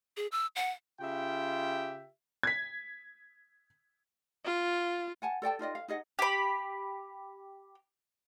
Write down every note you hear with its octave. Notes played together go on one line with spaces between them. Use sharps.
G#4
E6
F#5
C#3 F4 G4 E5 G5
G#6 B6
F4
F#5 G#5 A5
A4 D5 G5 A5
D#4 F4 D5 D#5
F5
D#4 G#4 D#5 F#5
G4 B5